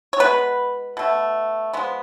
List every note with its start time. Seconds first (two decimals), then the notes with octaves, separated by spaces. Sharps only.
0.13 C#5
0.19 B2 G#3 B3 B4
0.97 B2 A3
1.73 F3 G#3 B3